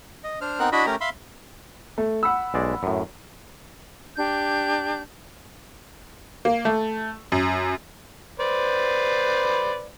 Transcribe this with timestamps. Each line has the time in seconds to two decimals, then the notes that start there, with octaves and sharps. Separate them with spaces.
0.24 D#5
0.41 D4 C5 F6
0.59 B3 C4 D#4 A#4 F#6
0.72 D4 E4 F#4 D#5 E5 B5
0.86 A3 C#4 G4 A#4 A#5
1.01 E5 F5 B5 C6
1.98 A3
2.23 F#5 B5 E6
2.54 B1 G#3 D5
2.83 F#2 A2
4.17 D4 G4 G6
6.45 A#3
6.65 A3
7.32 F#2
8.40 B4 C5 D5